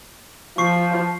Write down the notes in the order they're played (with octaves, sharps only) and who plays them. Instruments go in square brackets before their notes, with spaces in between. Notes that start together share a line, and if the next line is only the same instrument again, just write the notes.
[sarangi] F3 [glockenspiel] C#6 C7